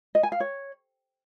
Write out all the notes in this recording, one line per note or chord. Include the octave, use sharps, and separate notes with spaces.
D#5
G#5
F5
C#5